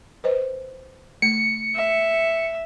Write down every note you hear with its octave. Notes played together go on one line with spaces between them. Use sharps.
B4 C5 D#5
A3 C#7
E5